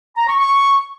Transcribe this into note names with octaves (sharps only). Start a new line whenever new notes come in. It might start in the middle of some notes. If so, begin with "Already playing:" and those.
A#5
C#6
C#6